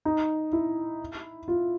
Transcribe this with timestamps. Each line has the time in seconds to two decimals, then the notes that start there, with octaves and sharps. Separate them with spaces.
0.05 D#4
0.53 E4
1.48 F4